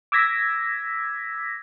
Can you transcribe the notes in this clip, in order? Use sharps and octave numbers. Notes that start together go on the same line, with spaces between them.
D6 E6 G#6 A#6 B6